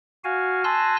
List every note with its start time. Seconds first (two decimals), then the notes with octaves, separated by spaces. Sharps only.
0.24 F#4 F5 G#5
0.64 G#5 A5 C6 E6 F#6 A#6